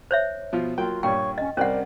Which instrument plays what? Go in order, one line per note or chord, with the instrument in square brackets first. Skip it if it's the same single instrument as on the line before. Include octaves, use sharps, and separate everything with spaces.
[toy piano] C5 C#5 E5
[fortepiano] B2 F3 F4
[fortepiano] F#3 A#3 G5 [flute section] F4
[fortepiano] G2 A#2 G3 [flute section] C#5 C#6 [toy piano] G5
[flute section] C#4 [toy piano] D#5
[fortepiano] C2 G3 F#6 [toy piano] C#4 F#5 [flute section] A#4 C5 D5